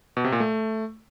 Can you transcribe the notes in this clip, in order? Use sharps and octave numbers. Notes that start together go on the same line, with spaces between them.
B2
C3
A#2
A3